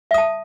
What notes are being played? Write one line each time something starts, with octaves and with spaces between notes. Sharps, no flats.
E5 A5 D#6